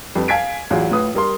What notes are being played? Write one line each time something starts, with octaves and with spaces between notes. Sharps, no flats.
F2 G3 B4
F5 G#5 G#6 B6 D7
A1 E2 F#3 F4
A2 F4 B4 D#6
G3 A#4 C6